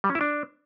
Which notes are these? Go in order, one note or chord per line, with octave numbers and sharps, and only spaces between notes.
G3
C#4
E4
D4